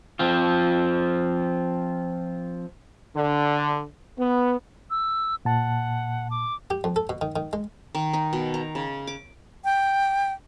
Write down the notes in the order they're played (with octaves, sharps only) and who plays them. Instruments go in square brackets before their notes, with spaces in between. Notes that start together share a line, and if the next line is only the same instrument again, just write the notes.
[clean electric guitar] F3 C4 F4
[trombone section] D3
B3
[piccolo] E6
[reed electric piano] A#2 A5 [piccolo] F#5
[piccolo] D6
[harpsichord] G4
F2
A4
B2
D#3
D#3
G#3
[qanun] D#3
D#4
B2
A#5
C#3
D6
[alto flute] G5